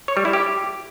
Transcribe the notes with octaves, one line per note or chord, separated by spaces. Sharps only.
C#5
G3
E4
G4